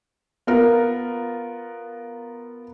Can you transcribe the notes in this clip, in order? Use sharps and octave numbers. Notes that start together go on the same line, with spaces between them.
B3 F4 A#4